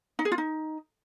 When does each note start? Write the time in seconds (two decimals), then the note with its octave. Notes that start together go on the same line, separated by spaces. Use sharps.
0.19 D#4
0.25 G#4
0.32 F4
0.38 D#4